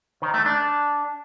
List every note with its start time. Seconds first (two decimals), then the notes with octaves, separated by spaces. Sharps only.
0.22 D#3
0.34 A3
0.46 D4